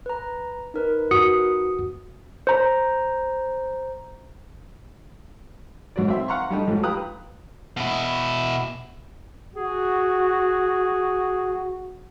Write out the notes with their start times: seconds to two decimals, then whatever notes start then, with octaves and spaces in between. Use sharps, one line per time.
0.06 B4 A#5
0.74 D#4 A#4 B4
1.11 F#4 D#6 C#7
2.47 C5 A#5
5.96 G#2 F#3 F#4 D5
6.08 C4 E5 C6
6.28 F5 F#5 A#5 C6 C#6
6.50 G3 A3 D4 D#4
6.68 G#2 F3 F#3 A3
6.83 G4 B4 F5 A#5 D#6 F#6
7.77 B2 E4
9.56 F#4 G#4